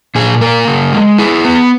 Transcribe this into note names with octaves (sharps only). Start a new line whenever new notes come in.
A#2 G#4
A#3 A#4
C#3
G#3
E4 G#4
B3